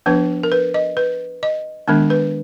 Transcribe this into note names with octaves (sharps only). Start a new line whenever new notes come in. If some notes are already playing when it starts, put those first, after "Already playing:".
F3 B3 D4 B4
A#4
B4
D#5
B4
D#5
D#3 G#3 B3 D4
B4